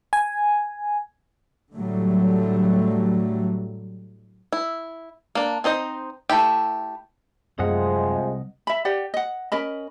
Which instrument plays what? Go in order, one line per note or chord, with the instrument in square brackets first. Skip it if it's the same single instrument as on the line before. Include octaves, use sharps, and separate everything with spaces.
[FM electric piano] G#5
[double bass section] A2 D3 F#3 G3 A3
[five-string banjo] E4
A#3 D4
C4 D#4 C5 D#5
A3 E4 G4
[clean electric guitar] C2 D#5 F#5 [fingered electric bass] F#2 A3 [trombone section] C3 F3 G#3
[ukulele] E5 B5
G4 D5 F#5
D#5 F#5
C#4 A#4 D#5 B5